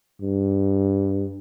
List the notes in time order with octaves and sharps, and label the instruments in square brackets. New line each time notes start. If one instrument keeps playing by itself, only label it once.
[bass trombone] G2